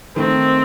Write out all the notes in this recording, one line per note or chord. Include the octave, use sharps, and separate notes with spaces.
D#3 A3 C4 D#4